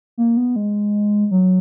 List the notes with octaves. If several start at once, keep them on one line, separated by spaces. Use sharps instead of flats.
A#3
B3
G#3
F#3